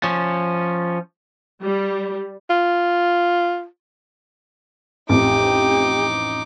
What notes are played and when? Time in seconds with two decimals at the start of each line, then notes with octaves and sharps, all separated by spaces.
0.03 F3 C#4
1.62 G3
2.50 F4
5.09 A1 F2 D#4 G4 D6